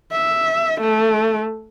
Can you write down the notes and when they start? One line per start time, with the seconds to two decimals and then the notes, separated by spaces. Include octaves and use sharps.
0.12 E5
0.81 A3